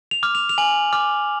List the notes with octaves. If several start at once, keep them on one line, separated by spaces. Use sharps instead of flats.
F7
D6 F6
F7
F7
G#5 F#7
D6 F6